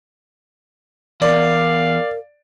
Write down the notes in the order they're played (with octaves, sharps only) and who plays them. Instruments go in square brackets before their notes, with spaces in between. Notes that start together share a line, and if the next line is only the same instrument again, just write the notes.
[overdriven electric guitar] E2 [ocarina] A#4 [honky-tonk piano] D5 [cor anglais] F5